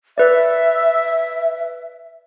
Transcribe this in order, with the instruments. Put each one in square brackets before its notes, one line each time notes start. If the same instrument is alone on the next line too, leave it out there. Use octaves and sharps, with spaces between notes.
[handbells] B4 D5 [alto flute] E5